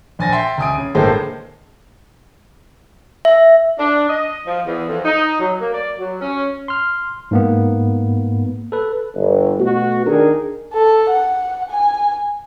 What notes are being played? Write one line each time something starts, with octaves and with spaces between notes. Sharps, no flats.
A#1 G#5 A6 A#6
E5 G5 C6
C#2 G#5 D#6 D7
C#3
G1 A2 G#3 A#3 A4 C5
E5
D4
D#5
F3
E2
F2
D#4
F#3
A#3
D5
F#3
C#4
C6 F6
G#2 A#3 B3
A4 B4
G1
B2 A3 F#4
D#3 D4 G#4 A#4
A4
F#5
G#5